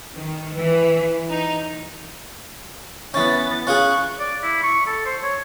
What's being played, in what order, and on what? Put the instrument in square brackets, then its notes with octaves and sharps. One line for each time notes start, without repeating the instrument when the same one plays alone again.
[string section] D#3
E3
D#4
[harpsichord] E3 C#4 [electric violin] B3 A6
[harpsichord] C#4 F4 G#4 [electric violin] C#6 F#6
[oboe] D5
E4
C#6
A4
C5
C#5